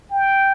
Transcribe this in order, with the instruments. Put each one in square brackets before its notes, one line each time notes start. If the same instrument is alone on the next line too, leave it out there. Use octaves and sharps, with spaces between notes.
[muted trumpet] G5